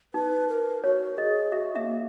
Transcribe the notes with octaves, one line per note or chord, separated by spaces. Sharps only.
D#4 B4
A#4
F#4 C#5
G#4 D#5
F#4 E5
A#3 E5